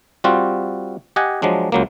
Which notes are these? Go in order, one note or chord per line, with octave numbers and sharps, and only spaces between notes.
G3 C4 F4 F#4
G4 D#5 F#5 G#5
F3 F#3 G#3 D4
C#2 F#3 A#3